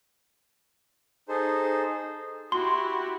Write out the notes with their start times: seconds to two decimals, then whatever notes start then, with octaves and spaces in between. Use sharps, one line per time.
1.29 D#4 G#4 A4 C5
2.52 E4 F#4 G4 C6